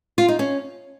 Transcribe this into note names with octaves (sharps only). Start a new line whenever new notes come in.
F4
D#4
C#4